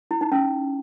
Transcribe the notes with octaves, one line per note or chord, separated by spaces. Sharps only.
E4
D#4
C#4